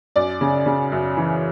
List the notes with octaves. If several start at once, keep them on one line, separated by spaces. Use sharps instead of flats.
F#2 D5
C#3
C#3
F#2
E3